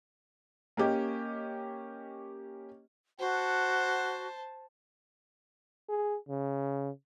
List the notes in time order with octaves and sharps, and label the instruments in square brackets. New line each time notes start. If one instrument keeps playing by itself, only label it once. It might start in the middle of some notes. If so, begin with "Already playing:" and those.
[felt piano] A#3 C#4 G4 D#5
[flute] F#4 [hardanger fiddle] C5 A5 [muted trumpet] F#5
[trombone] G#4
C#3